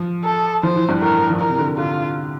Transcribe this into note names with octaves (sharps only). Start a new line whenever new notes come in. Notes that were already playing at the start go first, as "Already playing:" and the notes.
Already playing: F3
A4
F3 C5
E3
G2
A2 A#4
E3
F3
E3 A#4
C3
D3
D3 F4